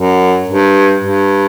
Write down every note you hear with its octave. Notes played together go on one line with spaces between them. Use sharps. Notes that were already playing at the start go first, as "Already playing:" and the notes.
Already playing: F#2
G2
G2